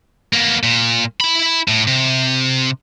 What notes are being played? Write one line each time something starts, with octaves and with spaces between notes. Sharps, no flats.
A#3 B3
A#2
E4 B5
A2
C3